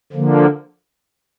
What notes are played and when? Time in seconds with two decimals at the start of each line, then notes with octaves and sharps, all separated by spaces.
0.12 D3 F3 A#3